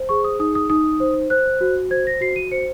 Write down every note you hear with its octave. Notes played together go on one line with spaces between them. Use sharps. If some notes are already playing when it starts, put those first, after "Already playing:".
Already playing: C5
G#4 C#6
D#6
D#4 D#6
D#6
D#4 D#6
C5
C5 F#6
F#4
C5 G#6
A#6
F#4 C7
D#7
C5 C#7